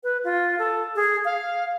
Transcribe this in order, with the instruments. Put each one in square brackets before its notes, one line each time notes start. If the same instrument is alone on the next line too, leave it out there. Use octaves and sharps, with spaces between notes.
[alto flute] B4
F4
A4
G#4
F5